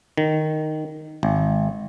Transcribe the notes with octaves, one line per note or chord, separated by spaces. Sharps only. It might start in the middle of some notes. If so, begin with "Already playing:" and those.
D#3
G#1